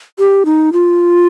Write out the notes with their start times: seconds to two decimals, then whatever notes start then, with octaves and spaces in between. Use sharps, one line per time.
0.19 G4
0.45 D#4
0.73 F4